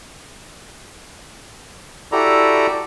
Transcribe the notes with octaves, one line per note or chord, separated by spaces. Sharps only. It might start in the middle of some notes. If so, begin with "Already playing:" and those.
E4 F#4 G4 A4 D5 A#5